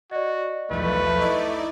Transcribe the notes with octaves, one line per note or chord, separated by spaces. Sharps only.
F#4 D5 D#5
B1 E2 F3 A3 B4
D#4 E4 D5 D#5